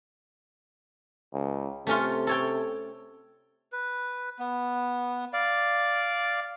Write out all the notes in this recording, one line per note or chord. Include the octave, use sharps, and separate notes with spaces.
C#2
C3 A3 C#4 F4
A4 C#5 G5
B4
B3
D5 F5